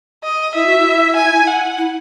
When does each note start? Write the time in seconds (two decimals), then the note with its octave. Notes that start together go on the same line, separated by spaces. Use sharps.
0.23 D#5
0.54 E4 E5
0.66 F#4
0.78 E4
1.16 G#5
1.47 F#5
1.78 E4